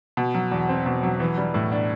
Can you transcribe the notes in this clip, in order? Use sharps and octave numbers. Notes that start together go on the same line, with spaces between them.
B2
F#3
E2
C4
B2
F#3
E3
G3
A2
D4